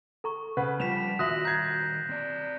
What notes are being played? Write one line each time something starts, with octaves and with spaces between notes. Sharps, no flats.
A4 A#5 C#6
C#3 B4 F#5
F3 G3 B6 E7 F7
D#3 G3 F#4 E5 D#6 F#6 A#6 F#7
A#5 G6 G#6 C7
C4 D5